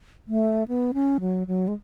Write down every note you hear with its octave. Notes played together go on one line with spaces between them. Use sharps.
A3
B3
C#4
F#3
F#3
G#3